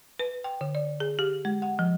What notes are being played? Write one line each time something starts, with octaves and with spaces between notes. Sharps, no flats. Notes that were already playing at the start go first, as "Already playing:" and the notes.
B4
G5
D3
D5
G#4
G4
G#3
F#5
F3